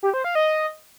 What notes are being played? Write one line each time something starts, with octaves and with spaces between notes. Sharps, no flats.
G4
C5
F5
D#5